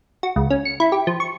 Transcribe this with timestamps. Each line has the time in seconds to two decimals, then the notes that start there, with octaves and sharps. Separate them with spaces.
0.23 F#4
0.36 C#2
0.50 C#4
0.65 C#7
0.80 E4
0.92 G4
1.07 F3
1.20 C#6